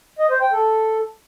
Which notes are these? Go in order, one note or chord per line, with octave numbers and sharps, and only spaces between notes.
D#5
C5
G5
A4